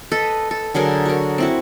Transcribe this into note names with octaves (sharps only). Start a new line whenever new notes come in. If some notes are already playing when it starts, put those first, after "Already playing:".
A4 B4 D#5
A4
D3 F#3 G#4 A#4
F#4 A#4
C4 E4 F#4